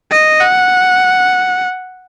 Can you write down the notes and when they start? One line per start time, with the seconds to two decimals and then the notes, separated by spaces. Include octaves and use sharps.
0.11 D#5
0.41 F#5